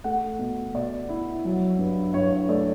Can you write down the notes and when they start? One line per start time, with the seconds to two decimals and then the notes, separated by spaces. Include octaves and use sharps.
0.04 A3 F#5
0.39 B2
0.74 B2 D5
1.09 E4
1.45 F#3
1.79 G2
2.14 G2 C#5
2.32 C#5
2.49 A3 D5